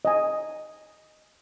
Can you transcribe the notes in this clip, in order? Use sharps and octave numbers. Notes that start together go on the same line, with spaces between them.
D#5 G#5